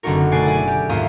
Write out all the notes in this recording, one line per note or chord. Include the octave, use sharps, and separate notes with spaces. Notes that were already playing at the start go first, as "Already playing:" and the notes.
F#1 D3 B3 D#4 F#4 A#4
B2 A3 D5 G#5 F#6 C7
E4 G#4 G#5
G4
D#2 G#2 A#3 F4 E5 D#6